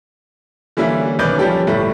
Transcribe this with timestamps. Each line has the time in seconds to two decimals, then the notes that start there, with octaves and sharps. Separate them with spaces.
0.77 D3 E3 G3 A#3 C#4 E4
1.19 B1 D#3 C#4 B4 D5 G6
1.38 F3 G3 C#4 G4 A4
1.67 G1 A2 G3 A3